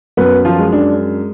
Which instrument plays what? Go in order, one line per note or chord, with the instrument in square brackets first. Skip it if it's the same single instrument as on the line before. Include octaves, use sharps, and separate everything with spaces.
[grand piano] F#2 B3 B4
F3 F4
G#3
D4